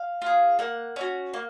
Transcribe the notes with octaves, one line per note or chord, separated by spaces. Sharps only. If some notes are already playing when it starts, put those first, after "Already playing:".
Already playing: F5
F4 G#4
A#3 F#5
C#4 F#4
A#3